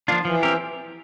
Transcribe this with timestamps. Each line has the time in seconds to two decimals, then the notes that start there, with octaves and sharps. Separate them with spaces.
0.08 F3 A#3 D4 F4
0.25 E3 F3
0.43 C4 G4 A#4